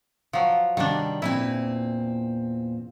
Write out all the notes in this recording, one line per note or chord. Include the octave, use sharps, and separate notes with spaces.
F3 F#3
C3 D#3 G3 D4
E2 A#2 C4 E4 G#5